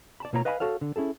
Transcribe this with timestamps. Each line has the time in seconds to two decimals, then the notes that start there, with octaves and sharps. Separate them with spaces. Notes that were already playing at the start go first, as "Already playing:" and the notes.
0.20 D5 A5 B5
0.33 B2 A#3 F4 C#5 D#5 A#5
0.45 B4 D#5 F5 G#5 A#5 B5
0.60 F#4 A4 C#5 F5
0.81 D3
0.96 C#4 E4 G#4 A4